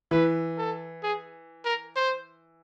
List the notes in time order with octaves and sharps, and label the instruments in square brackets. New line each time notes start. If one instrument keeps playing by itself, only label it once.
[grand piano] E3 [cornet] B4
[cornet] A4
G#4
A#4
C5